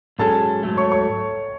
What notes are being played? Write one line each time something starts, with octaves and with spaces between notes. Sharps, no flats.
G#2 F#3 C#4 G#4 A4 A5
G#2 F#3 A3
C#5 C#6
C#5 C#6